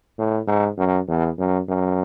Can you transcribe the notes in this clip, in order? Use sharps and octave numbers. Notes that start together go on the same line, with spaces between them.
A2
G#2
F#2
E2
F#2
F#2